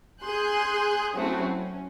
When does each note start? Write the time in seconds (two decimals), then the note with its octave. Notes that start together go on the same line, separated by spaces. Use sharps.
0.23 G#4 G#5 C6 F#6 G6
1.15 F#3 A3 C4 C#4 E4 F#4
1.55 C#4